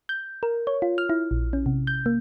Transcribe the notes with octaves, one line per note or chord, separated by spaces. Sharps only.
G6
A#4
C#5
F4
F6
E4
A#1
C#4
C3
G6
A#3